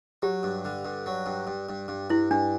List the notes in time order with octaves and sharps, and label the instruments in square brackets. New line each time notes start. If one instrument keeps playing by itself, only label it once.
[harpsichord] F#3 [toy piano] G4
[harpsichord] G2
D3
G2
F#3
G2
G2
G2
G2
[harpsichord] G2 [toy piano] E4
[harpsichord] G2 [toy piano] D4